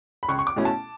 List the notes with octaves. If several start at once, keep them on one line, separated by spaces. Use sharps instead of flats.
B5
C#2 C#6
C#6
D6
B2 A3 C#4 E4
A5